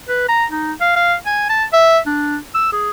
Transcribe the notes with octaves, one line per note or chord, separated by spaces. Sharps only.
B4
A#5
D#4
F5
F5
G#5
A5
E5
D4
E6
G#4